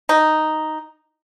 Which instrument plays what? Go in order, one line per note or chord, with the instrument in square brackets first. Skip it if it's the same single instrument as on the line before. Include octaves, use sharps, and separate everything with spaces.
[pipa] D#4